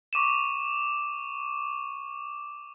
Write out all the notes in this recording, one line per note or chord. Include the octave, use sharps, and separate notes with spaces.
C#6 D6 D#7 E7